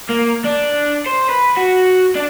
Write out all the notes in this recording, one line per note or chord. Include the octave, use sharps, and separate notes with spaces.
A#3
D4
C5
B4
F#4
D4